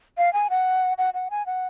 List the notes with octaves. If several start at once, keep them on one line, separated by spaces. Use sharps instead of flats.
F5
G#5
F#5
F#5
F#5
G#5
F#5